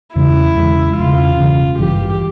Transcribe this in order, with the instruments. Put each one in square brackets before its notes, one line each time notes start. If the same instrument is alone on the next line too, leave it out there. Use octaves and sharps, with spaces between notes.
[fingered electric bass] E2 C#3 E3 G#3 [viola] E4
[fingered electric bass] E2 C#3 E3 G#3
[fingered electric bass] E1 E2 C#3 [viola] F4
[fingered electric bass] E1 E2 C#3
[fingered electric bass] G#1 G2 E3 [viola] G4